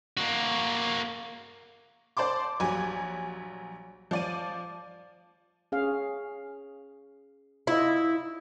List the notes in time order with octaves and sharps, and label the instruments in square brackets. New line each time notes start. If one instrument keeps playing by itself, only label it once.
[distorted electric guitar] A#3 F#4
[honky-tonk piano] C5 D5 A5 C6 D6
A#1 F#3 G3 G#5
F3 D5 D#7
[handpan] C#4 G#4 F5
[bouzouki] E4 [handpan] F4 D#5